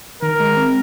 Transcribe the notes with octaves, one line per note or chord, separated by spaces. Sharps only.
D#3 A#4
G#3
C4